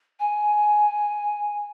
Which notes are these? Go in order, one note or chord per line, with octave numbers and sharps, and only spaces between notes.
G#5